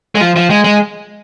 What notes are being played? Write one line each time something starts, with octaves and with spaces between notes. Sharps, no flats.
G#3
F3
F3
G#3
G#3